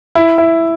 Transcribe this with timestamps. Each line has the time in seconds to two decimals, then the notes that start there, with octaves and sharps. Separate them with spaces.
0.15 E4
0.38 E4